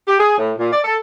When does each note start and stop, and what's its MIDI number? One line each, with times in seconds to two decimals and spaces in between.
0.08 0.15 67
0.19 0.37 68
0.38 0.54 45
0.58 0.72 46
0.73 0.80 74
0.84 0.97 69